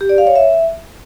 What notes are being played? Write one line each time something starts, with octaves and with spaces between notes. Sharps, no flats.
G4
D5
F5
C#5
E5